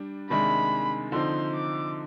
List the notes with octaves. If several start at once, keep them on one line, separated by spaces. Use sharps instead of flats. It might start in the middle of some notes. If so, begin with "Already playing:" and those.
Already playing: G3 D4
C3 D#3 G#3 D4 B5
D3 F3 C4 D#4 C6
D6